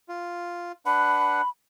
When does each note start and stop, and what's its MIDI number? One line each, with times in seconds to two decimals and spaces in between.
0.09 0.72 65
0.86 1.41 62
0.86 1.41 71
0.86 1.41 78
0.86 1.49 83